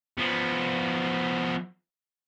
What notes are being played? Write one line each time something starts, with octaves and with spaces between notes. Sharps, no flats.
F3 B3